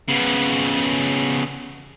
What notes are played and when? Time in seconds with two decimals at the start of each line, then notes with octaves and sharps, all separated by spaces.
0.09 C#3 B3